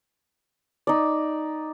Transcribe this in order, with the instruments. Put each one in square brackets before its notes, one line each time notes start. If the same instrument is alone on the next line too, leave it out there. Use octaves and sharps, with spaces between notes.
[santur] D#4 D5